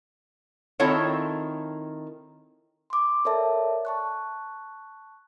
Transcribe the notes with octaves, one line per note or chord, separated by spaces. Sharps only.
D#3 C4 E4 F4 A4 C#5
C6 D6
A4 A#4 C#5 D5 E5 A5
A5 C#6 F#6